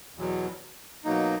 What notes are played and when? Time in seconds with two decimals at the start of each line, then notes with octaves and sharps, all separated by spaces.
0.16 E2 B2 F#3
1.05 B2 F#3 A#3 D#4